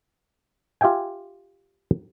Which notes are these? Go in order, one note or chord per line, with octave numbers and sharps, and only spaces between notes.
F4 G4 E5 G5 G#5